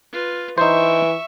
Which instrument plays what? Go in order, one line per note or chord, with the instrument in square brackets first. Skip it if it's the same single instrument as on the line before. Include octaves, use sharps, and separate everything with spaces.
[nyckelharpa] F4 B4
[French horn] E3 [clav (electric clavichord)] D#4 C5 [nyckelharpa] E5 C#6